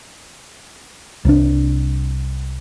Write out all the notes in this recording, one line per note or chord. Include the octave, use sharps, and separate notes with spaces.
C2 D4